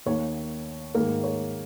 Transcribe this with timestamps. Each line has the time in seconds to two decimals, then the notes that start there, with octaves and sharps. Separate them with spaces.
0.06 D#2 D#3 A#3 C#5
0.95 G#2 D#3 A#3 A#4
1.24 C#5